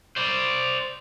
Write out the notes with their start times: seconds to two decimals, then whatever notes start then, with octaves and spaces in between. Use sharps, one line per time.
0.16 C5 D5